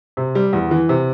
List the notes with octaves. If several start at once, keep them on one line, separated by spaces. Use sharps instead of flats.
C3
G3
E2
E3
C3